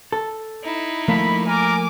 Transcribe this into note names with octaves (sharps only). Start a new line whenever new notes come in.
A4
D#4 E4
F3 A3 A#3 B5
A#4 G#5 D6